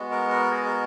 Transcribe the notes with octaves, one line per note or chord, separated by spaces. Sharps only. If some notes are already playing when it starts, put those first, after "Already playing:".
Already playing: G#3 B3 F#4
A#4
A#4
G#4
A#4